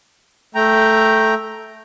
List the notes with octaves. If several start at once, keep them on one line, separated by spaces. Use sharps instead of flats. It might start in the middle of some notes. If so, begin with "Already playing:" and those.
A3 G5 A#5